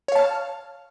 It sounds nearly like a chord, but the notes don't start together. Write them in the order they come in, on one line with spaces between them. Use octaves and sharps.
C#5 F5 A5 F6